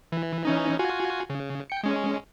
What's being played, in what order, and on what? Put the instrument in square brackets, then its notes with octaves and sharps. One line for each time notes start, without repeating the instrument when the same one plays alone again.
[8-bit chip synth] E3
E3 C#4 D#4
F4 F#4 G#5
C#3
G5 C#7
G#3 C#4